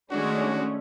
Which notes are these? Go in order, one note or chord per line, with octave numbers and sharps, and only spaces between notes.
D#3 G#3 A3 C#4 D4 F#4